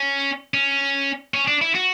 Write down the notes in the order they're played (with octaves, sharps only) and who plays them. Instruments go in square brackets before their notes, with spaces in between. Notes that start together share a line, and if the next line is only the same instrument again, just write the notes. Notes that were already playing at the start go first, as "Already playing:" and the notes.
Already playing: [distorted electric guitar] C#4
C#4
C#4
D4
E4
F#4